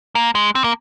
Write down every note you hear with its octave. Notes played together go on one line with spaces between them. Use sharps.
A#3
G#3
C4
A#3